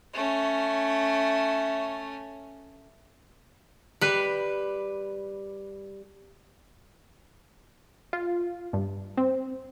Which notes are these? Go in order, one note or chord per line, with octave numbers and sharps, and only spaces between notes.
A3 C#4
G3 B4
F4
G2
C4